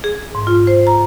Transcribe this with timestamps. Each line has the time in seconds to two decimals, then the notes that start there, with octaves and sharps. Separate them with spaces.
0.04 G#4
0.35 G#2
0.47 F4
0.67 C5
0.87 A#5